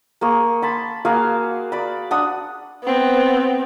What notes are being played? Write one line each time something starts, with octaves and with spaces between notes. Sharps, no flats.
A#3 G#4 C#6
A5 B5 C6
A#3 F#4 G#4 F5
D5 B5
D4 F#5 D#6
B3 C4